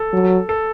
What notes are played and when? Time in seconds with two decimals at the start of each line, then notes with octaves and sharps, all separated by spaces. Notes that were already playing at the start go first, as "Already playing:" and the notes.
Already playing: A4
0.13 F#3
0.49 A4